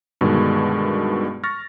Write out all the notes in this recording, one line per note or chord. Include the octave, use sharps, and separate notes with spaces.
G2 B2 D3 D#3 G#3
C#6 F6 A6 A#6